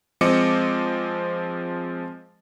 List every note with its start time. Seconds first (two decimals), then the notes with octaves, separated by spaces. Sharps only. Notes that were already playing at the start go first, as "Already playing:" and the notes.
0.21 F3 G#3 C4 D#5 D6 C#7